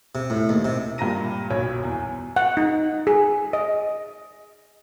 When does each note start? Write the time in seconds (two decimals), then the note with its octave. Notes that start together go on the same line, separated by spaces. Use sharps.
0.15 C3
0.30 A2
0.49 D#2
0.65 C3
0.98 G2 A#2 A#5 A#6 D#7
1.50 B1 F#2 C#5
1.84 E2
2.36 F#5
2.57 D#4
3.07 G#4
3.53 D#5